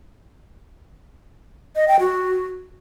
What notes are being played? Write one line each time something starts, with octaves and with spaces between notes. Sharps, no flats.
D#5
G5
F#4